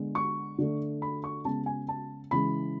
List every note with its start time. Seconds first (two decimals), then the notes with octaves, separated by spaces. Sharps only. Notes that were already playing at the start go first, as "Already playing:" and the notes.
Already playing: D3 G#3 B3
0.15 C#6
0.58 D3 A3
1.02 B5
1.24 C#6
1.45 C#3 G#3 B3 A5
1.66 G#5
1.88 A5
2.31 C#3 E3 G#3 B5